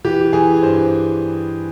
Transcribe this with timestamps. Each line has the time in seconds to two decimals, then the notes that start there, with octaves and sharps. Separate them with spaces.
0.05 E3 G4
0.33 E3 G#4
0.63 G2 C5